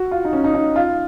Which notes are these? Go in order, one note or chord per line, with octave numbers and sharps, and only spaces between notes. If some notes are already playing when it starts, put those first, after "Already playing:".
Already playing: F#4
F4
D#4
C#4
D#4
D#4
F4